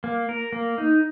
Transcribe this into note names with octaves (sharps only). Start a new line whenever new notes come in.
A#3
A#4
A#3
D#4